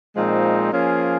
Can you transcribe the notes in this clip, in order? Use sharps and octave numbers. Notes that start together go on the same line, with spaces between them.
A#2 F3 G#3 C4 D#4
F3 A#3 C#4 F4 G#4